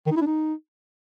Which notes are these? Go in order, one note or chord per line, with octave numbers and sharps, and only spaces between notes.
D#3
D#4
E4
D4
D#4